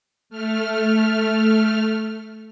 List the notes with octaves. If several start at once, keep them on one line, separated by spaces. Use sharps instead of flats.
A3 F6